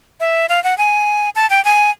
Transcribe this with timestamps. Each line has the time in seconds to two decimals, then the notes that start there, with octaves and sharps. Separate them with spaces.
0.20 E5
0.49 F5
0.64 F#5
0.78 G#5
1.36 A5
1.50 G5
1.65 G#5